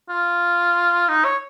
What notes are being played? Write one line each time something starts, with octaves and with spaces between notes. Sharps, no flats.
F4
D#4
C#5